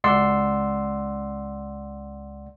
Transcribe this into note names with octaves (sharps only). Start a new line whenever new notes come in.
C#2 D5 F#5 C6 E6 C7